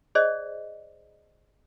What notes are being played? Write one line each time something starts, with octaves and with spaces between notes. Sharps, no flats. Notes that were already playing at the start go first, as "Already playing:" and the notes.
G#4 C5 D5 D#5